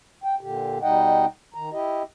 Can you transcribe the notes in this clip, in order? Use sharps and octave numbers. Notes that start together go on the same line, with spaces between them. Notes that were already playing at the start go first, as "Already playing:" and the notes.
G5
A#2 D3 G4
B2 G3 D#4 D#5 F#5 G5
D#3 A#5
E4 G4 D#5